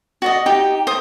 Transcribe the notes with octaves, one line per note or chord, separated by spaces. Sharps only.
F#4 D5 D#5
D#4 G4 G5
C5 D#6